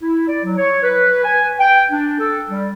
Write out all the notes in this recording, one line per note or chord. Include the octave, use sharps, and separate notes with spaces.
E4
D5
F#3
C#5
B4
G#5
G5
D4
A4
G3